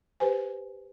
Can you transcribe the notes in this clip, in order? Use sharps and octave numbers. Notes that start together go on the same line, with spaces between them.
G4 B4 C5 G#5